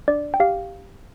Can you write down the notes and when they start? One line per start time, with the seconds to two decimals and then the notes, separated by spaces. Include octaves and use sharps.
0.08 D4 D5
0.34 G5
0.40 G4 F5